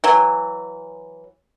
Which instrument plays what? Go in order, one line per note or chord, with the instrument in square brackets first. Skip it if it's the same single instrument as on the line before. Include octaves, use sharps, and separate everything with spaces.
[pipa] E3 F#3